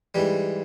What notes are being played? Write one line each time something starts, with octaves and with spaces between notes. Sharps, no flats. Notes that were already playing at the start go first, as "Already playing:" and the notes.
G#2 E3 G3